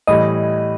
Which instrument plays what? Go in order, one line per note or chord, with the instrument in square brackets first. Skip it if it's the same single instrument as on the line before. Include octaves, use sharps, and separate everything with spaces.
[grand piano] A2 E3 G3 [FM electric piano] D#5